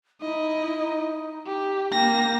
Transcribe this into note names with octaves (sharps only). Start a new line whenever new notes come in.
D#4 E4 D#5
G4
A#3 G5 A#6